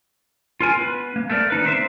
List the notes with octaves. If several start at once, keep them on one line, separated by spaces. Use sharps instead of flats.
F4 A#4 G#5
B3 B4
A#3
A3 A#3 A#4 D5
D#3 D#4 B4
A#3 C4 C5 E5